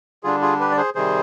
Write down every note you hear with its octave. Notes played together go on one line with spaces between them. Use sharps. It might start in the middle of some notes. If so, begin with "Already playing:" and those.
D3 G3 D4 F4 G#4
F4 G#4
G4 B4
D5
G#4 C5
C3 D#3 G3 G#4 C5